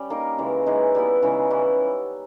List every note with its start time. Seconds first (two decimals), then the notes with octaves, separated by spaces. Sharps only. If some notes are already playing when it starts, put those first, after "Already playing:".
Already playing: G3 C#4 G4
0.10 A#3 D#4 A#4 D#5
0.38 C#3 E3 G#3
0.66 E3 G#3 D#4 G#4
0.95 G3 B3 E4
1.22 C#3 E3 G#3 D#4
1.51 E3 G3 C#4 E4